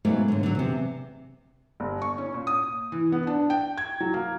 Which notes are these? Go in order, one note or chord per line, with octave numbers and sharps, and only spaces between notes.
G#2 B2 F#3 A3 A#3
D#2 D3
D3 F#3
E2 C3
G1
C#6
C#4
A#2
D#6
E3
B3
D4
G5
G#6
F#3
A#3